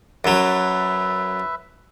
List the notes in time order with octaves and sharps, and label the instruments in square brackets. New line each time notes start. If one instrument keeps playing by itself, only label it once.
[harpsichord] F#2 F#3 [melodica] B4 E5